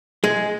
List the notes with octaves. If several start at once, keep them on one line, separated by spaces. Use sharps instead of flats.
G#3